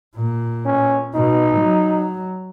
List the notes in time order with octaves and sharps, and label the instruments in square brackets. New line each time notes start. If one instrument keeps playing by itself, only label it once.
[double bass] A#2
[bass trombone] C#4
[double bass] B2 [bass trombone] D#4
[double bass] F#3